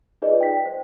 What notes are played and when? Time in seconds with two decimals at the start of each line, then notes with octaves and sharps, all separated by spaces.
0.22 D#4 F4 G#4 B4 D5 D#5
0.41 G5 B6
0.66 C5